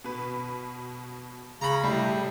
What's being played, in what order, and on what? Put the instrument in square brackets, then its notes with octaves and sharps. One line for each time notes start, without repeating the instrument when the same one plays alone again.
[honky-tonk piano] B2 B4
[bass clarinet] C#3 [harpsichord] A#5 B5
[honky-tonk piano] A2 A4 C7 [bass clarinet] C3 [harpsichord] G3